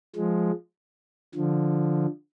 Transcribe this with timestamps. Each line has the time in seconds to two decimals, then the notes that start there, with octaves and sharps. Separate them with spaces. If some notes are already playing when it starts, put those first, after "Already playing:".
0.16 F3 G#3
1.35 D3 F3